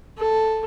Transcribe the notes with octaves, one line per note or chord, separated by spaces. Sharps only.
A4